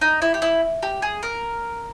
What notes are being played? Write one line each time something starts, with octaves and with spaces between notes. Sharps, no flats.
D#4
E4
G4
E4
G4
G#4
A#4